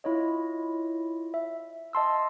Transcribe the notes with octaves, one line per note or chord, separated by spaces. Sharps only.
E4 F4 C#5 D#5
E5
D#5 A5 C6 E6